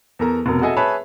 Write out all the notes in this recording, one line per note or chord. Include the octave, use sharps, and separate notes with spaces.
E2 A4 A#4 A#5
F1 B2 A#4
F#4 G#4 A4 D#5 E5 G#5
G#4 B4 C#5 E5 A5 B5